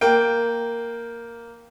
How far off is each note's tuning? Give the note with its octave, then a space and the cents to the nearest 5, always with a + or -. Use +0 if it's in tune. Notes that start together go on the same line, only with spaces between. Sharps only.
A#3 +0 G5 +0